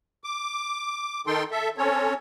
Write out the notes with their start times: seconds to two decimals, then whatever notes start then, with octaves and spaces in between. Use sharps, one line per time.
0.24 D6
1.27 D#3 D#4 A4 G5 C6
1.51 A4 E5
1.78 C4 C#4 A4 C#5